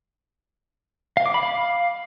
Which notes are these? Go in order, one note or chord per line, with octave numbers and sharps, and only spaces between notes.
F5
D6
B5
F5